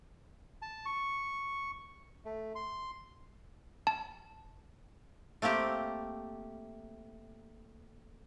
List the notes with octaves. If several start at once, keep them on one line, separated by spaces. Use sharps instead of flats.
A5
C#6
A3
C6
A5
A3 A#3 C4 G4